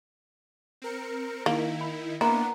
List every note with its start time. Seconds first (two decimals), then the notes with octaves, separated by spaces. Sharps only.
0.82 C4 A#4 C#7
1.46 D#3 A#3 D#4 E4
1.81 B5
2.21 A#3 B3 D4 E4 F#5 A#5 C6